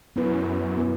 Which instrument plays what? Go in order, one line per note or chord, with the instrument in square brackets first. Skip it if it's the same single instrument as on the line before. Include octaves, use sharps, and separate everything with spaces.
[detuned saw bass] F#2 [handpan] B3 E4 B4
[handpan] B3 E4 B4